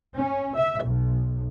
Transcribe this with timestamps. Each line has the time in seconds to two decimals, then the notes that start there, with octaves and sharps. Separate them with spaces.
0.15 C#4
0.56 E5
0.84 B1